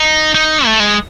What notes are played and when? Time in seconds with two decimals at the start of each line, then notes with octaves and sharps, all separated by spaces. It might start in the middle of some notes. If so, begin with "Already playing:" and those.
Already playing: D#4
0.35 D#4
0.66 A3
0.80 G#3